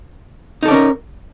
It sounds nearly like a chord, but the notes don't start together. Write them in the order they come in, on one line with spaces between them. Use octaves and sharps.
D#4 A4 D5 C#4 A#4